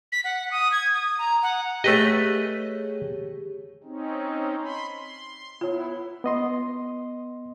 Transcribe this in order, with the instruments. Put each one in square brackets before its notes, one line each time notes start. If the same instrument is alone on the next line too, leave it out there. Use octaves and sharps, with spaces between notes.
[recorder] B6
F#5
D#6
G#6
D#6
A#5
F#5
[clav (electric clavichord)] A3 B4 D#5 [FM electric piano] G4 G#4 C#5
[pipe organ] C4 C#4 D#4
B5 C6
C6
[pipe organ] B3 E4 [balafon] F4 C#5
[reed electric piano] B3 D#5 C6